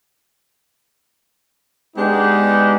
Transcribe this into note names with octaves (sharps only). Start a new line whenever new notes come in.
G#3 B3 D4 D#4 G4